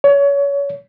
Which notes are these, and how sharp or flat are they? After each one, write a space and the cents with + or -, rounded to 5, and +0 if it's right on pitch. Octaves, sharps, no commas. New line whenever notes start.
C#5 +25